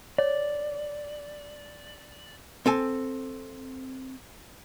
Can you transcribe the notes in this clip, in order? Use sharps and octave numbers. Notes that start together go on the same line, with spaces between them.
C#5 D5
C4 A4 G#5